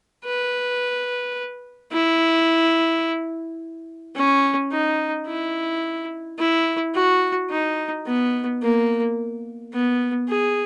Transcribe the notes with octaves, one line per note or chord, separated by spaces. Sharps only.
B4
E4
C#4
D#4
E4
E4
F#4
D#4
B3
A#3
B3
G#4